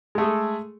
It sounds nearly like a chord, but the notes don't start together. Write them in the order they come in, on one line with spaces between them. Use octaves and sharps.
G#3 A3 G#4 A4